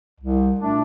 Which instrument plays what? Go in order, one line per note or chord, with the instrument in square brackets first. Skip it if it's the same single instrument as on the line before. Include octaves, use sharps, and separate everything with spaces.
[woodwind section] C2
A#2 A3 D4